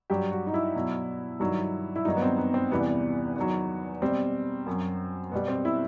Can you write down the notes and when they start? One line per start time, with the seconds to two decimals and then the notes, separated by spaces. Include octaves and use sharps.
0.10 G2 F#3 G4
0.31 F#4
0.47 D#4
0.54 E4
0.76 B2 F#3
1.40 G2 D#3 F#3
1.96 E4
2.05 G2 D#3 F#3 D#4
2.17 B3
2.22 C4
2.38 B3
2.54 C4
2.71 E2 C3 E3 G3 B3
3.36 E2 D#3 F#3
4.02 B2 G3 C4
4.66 F#2 F#3
5.32 B2 G3 B3
5.48 C4
5.65 E4